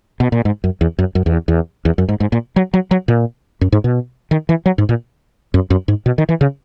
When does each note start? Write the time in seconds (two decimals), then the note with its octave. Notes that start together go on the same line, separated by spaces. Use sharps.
0.20 B2
0.32 A#2
0.45 G#2
0.64 F#2
0.81 E2
0.98 F#2
1.15 F#2
1.26 E2
1.48 E2
1.85 E2
1.98 F#2
2.09 G#2
2.20 G#2
2.32 A#2
2.56 F#3
2.74 F#3
2.91 F#3
3.08 A#2
3.61 F#2
3.72 G#2
3.84 B2
4.31 D#3
4.49 E3
4.66 F#3
4.78 G#2
4.89 A#2
5.54 F#2
5.70 F#2
5.88 G#2
6.06 B2
6.18 D#3
6.29 E3
6.41 C#3